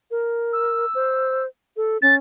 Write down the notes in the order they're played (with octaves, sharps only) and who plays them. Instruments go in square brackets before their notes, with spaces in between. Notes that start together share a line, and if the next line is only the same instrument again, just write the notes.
[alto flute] A#4
[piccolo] E6
[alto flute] C5
A4
[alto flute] C#4 [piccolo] A6